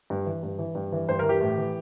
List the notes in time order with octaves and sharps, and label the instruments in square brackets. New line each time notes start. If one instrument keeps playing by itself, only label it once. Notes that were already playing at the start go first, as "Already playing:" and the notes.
[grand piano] G2
E3
G2
E3
G2
E3
G2 C5
E3 A#4
G4
A2
E3